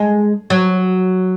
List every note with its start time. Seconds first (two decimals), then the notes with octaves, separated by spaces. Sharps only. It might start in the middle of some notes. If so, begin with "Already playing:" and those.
Already playing: G#3
0.50 F#3